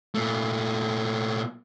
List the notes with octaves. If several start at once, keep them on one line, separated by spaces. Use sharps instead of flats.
A#2 A3